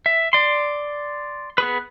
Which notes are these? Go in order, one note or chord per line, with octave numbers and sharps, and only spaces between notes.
E5
D5 C6
B3 G#4 B4